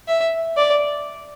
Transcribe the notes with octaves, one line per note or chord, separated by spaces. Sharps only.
E5
D5